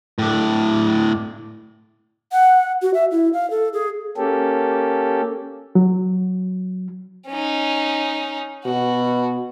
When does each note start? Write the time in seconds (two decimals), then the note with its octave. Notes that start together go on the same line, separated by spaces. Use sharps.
0.19 A2 D4
2.32 F#5
2.82 F#4
2.94 E5
3.11 E4
3.33 F5
3.51 A4
3.73 G#4
4.17 A#3 C#4 G4 A4
5.75 F#3
7.28 C#4 D#4
8.66 B2 F#4